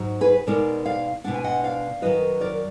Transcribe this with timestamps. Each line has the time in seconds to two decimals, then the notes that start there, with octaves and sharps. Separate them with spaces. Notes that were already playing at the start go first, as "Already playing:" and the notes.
Already playing: G#2 F#3 D#4
0.21 G#4 B4
0.47 B2 G#3 D#4 A#4 D5
0.86 D5 F5
1.24 B2 G#3 D4 F#5
1.34 G#5
1.44 D#5 F#5
1.64 D5 F5
2.02 F#2 D#3 F#3 B4 D#5
2.41 A#4 D5